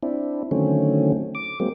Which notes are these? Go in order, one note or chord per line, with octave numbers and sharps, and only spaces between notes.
C4 D4 E4
D3 D#3 F#3 A3 C4 C#4
D6
F#3 G#3 A#3 C4